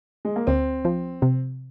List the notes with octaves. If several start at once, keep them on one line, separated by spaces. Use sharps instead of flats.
G#3
A#3
D2 C4
F3
C3